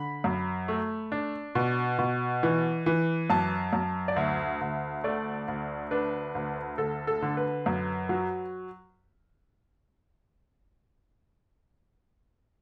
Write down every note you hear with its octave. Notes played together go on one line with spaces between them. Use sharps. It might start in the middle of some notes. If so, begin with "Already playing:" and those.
Already playing: D3 B5
F#2
A3
D4
B2
B2
E3
E3
F#2 A5
F#2
D5
D2 E5
D2
A3 D5
D2
D4 B4
D2
D2 A4
A4
D3
B4
F#2
F#3